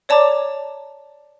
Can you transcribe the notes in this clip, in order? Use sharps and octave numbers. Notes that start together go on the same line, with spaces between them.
C#5 D5 A5 A#5 D6